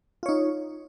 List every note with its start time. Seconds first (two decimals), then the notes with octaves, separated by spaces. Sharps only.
0.23 F4
0.26 C#5
0.29 D#4